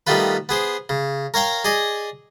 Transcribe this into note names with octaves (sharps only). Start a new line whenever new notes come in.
D#3 G3 A3 B3 F4 B4
B3 G#4 C5
C#3
A#4 C#5 F5 G5 A#5
G#4 D5 D#5 G#5